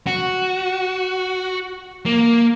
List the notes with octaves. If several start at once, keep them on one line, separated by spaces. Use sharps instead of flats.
F#4
A#3